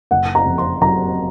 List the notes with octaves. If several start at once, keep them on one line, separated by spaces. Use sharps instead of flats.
F#1 F#5
A#5
F2
C6
F#3 A#5